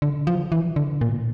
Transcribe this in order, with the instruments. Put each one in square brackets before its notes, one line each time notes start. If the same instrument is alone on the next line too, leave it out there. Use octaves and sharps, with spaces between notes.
[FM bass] D3
F3
E3
D3
A#2